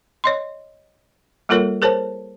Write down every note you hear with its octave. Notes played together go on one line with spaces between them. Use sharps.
C#5 D#5 C6
G3 A#3 F4 A4 A#4 C#5
G#4 A#4 C5 C#5 A5